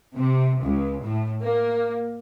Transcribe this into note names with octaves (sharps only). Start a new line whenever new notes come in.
C3
C#2
A2
A#3